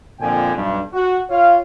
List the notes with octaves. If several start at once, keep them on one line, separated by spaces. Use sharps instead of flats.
F2 A#2 D3 G5 G#5
B1 G2
F#4
F4 C#5 F5